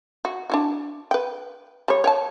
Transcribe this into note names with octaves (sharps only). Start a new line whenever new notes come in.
F#4
D4 E4 F#4
B4 G5
G3 C#5
C#5 G5 A5